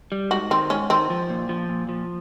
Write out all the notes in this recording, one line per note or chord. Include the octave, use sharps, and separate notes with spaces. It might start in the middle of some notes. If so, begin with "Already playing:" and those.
G3
G#2 F#4
D#3 C4
G#2 C#4
D#3 C4
F3
A#2
F3
A#2
F3